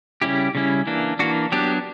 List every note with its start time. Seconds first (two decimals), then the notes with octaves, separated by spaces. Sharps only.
0.22 C#3 G3 C#4 E4 G4
0.55 C#3 G3 C#4 E4
0.87 E3 A#3 D4
1.19 E3 A#3 D4 F#4
1.52 F#3 B3 D4 G4